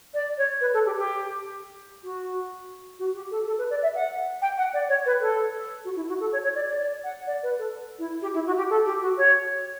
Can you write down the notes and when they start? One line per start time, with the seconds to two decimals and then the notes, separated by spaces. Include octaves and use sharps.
0.14 D5
0.37 C#5
0.61 B4
0.74 A4
0.86 G4
0.98 G4
2.03 F#4
2.99 F#4
3.15 G4
3.31 A4
3.47 A4
3.58 B4
3.70 D5
3.83 E5
3.95 F#5
4.42 G5
4.58 F#5
4.73 D5
4.89 C#5
5.06 B4
5.21 A4
5.85 F#4
5.96 E4
6.08 F#4
6.20 A4
6.33 C#5
6.43 C#5
6.55 D5
6.68 D5
6.79 D5
7.04 F#5
7.27 D5
7.43 B4
7.59 A4
7.99 E4
8.22 G4
8.34 E4
8.46 F#4
8.57 G4
8.70 A4
8.86 G4
9.01 F#4
9.18 C#5